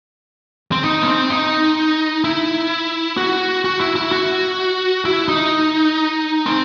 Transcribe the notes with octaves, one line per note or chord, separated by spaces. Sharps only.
C4
D#4
B3
C4
D#4
E4
F#4
F#4
E4
E4
F#4
E4
D#4
C4